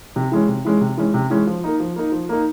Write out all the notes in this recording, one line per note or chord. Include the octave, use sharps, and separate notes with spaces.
C3
E3 G#3 C#4
C3
E3 G#3 C#4
C3
E3 G#3 C#4
C3
E3 G#3 C#4
F3
A#3 D#4
F3
A#3 D#4
F3
A#3 D#4